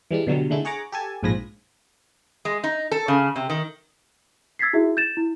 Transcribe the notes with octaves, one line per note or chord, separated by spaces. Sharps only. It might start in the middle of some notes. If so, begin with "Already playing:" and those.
E3 G3 G#3 D4
B2 D3 F#3 G3
D3 G#3 A3 E4
G#4 C#5 F#5 A#5 D6
G4 A4 G#5 A5
A#1 G#2 F3 G#5 B5 A#6
G#3
D#4
A4
C#3
C3
D#3
E6 G#6 A6 B6 C7
D#4 E4 F#4 G#4 E5
G6 A6 E7
E4